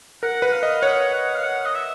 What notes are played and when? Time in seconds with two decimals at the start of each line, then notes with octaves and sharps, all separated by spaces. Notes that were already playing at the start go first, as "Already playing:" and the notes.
0.23 A#4 F#5
0.42 B4
0.52 F5
0.63 D#5
0.83 C#5 F#5
1.14 F#5
1.35 F5
1.44 F#5
1.65 D#5
1.75 E5